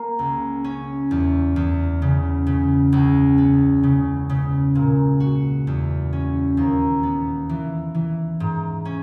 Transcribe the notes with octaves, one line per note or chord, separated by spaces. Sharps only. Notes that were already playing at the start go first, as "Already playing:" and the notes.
Already playing: A#3
C#2
C#4
E2
E2
C#3
C#3
C#2
B3
C#3
C#3
A#2
F#4
E2
C#4
D#2
B3
E3
E3
G#2
C#4